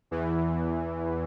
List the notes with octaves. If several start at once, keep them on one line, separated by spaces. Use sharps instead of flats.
E2 E3